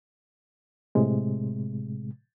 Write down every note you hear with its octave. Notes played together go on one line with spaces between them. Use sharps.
A2 C3 G#3